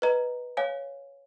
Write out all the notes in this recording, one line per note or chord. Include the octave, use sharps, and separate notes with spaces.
B4 D#5 A#5
C#5 F5 G#5